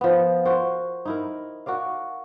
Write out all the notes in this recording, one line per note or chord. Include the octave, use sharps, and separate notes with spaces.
F3 B3
F#4 A#4 C5
D#4 E4 A#4
F#4 A#4 D5 F5